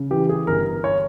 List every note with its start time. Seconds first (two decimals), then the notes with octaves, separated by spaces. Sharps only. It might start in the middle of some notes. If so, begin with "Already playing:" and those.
Already playing: C#3
0.10 E3 G4
0.29 G#4
0.47 G1 A#4
0.84 C#5